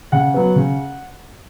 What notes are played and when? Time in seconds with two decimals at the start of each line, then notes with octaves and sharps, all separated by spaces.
0.12 C#3 F#5
0.34 F#3 B3
0.56 C#3